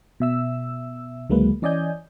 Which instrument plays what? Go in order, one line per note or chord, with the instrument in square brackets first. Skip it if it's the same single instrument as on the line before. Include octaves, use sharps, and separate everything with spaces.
[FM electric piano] B2 E5 E6
C#2 D3 F#3 G#3 A#3 B4
E3 C#4 D5 D#5 G#5 G6